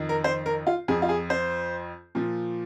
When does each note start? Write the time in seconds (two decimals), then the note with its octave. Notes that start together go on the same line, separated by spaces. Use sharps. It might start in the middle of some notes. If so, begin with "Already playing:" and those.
Already playing: F2 D#3
0.09 A#4
0.24 C5
0.46 A#4
0.67 F4
0.88 F2 F3 G#4
1.02 F4
1.09 G#4
1.30 C5
2.15 A#2 F3